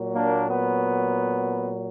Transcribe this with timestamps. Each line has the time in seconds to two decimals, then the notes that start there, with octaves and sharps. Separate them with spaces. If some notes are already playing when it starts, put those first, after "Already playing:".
Already playing: A#2 F#3
0.15 A#3 D4
0.49 B3